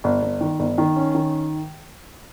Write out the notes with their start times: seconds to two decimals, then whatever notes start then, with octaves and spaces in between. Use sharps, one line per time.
0.04 G1
0.22 G1
0.41 D#3
0.59 G1
0.78 D#3
0.96 C#4
1.15 D#3